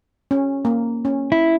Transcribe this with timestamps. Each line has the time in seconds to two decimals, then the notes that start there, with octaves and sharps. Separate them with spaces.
0.31 C#4
0.65 A#3
1.05 C#4
1.32 E4